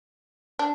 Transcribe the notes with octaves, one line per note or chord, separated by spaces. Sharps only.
D4